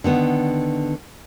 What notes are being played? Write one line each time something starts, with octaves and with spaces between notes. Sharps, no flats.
D3 D#3 B3